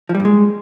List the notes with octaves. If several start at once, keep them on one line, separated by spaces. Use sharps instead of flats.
F3
G3
G2
G#3